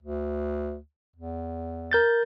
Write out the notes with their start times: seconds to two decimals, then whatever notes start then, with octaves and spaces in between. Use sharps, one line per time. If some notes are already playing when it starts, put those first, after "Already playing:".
0.03 D2
1.16 E2
1.92 A#4 G6 A6